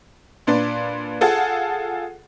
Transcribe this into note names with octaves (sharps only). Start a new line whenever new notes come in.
A#2 D4 B4 D5 C6
F4 G#4 A4 F#5